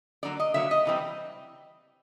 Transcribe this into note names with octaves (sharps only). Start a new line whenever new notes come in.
D3 F#3 A#3 D5
D#5
D3 F#3 A#3 E5
D#5
C3 E3 G3 C4